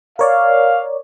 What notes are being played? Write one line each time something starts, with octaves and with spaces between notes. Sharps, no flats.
A#4 C#5 D5 F5